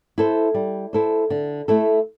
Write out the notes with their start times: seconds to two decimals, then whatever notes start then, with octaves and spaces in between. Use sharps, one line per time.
0.18 E4 A4 C5
0.54 G3
0.93 E4 A4 C5
1.30 D3
1.68 A3 E4 A4